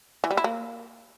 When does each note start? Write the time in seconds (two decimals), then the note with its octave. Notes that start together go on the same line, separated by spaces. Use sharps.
0.24 E3
0.31 G3
0.37 E4
0.44 A#3